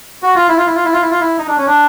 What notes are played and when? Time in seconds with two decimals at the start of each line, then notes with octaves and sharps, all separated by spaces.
0.23 F#4
0.36 F4
0.49 E4
0.57 F4
0.66 E4
0.75 F4
0.85 E4
0.93 F4
1.02 E4
1.11 F4
1.21 E4
1.38 D#4
1.47 D4
1.57 C#4
1.67 D4